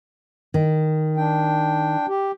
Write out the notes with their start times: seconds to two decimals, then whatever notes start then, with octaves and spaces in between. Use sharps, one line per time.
0.54 D#3
1.17 D4 G5
2.08 G4